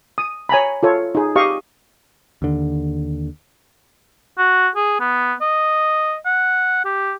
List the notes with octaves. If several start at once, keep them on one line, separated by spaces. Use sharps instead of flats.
D#6
C#5 G#5 A#5 B5
F4 A4 C#5
D#4 G#4
G4 D#5 F5 C#6
D#2 D3
F#4
G#4
B3
D#5
F#5
G4